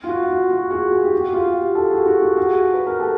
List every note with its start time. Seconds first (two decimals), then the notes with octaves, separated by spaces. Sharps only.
0.04 F4
0.08 F#4
0.30 F#4
0.50 F#4
0.71 F#4 G#4
0.92 F#4 G#4
1.04 G4
1.13 F#4
1.33 F4 G4
1.75 G4 A4
1.90 F#4 G#4
2.06 F#4 G#4
2.22 F#4
2.37 F#4 G#4
2.74 B4
2.87 A#4
2.99 G4 A4